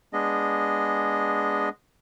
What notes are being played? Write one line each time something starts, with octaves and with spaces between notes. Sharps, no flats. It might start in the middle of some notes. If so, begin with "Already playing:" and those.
G#3 B3 D4 G#4 D#5